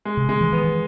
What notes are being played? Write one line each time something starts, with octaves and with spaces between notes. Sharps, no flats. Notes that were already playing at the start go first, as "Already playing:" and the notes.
G#3
C3
C#3 G#3
E3
E3 B3
E3